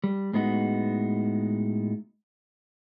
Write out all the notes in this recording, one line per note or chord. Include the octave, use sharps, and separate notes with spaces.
G3
A2 G#3 B3 D#4 F#4